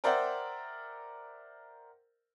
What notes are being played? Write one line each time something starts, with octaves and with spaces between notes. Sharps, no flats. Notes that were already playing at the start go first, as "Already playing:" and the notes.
A#4 C5 D5 E5 F#5 G5